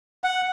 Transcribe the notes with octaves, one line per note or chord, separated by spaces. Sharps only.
F#5